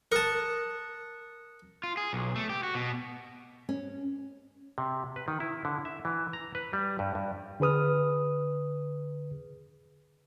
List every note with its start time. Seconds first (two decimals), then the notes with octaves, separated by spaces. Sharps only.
0.12 A#4 A5 D#6 F#6 C#7
1.84 F4
1.97 G#4
2.13 B1
2.36 A3
2.49 G4
2.63 F#4
2.75 B2
3.69 C#4
4.78 C3
5.16 B4
5.28 D#3
5.40 E4
5.65 D3
5.85 E5
6.05 E3
6.33 A#5
6.55 B4
6.73 G3
6.99 G2
7.15 G2
7.60 D3 G#4 B4 D#6 F6